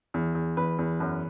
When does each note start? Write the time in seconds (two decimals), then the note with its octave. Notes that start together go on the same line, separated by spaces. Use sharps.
0.14 E2
0.35 E2
0.57 E2 B4
0.79 E2
1.00 F#2